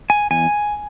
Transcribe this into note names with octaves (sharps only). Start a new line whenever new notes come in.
G#5
E2 G#5